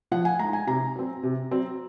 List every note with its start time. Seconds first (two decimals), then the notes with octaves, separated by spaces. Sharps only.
0.11 F3 F#5
0.25 G#5
0.39 G#3 D#4 A#5
0.53 G#5
0.67 C3 A#5
0.96 F#3 C4
1.23 C3
1.51 F#3 C4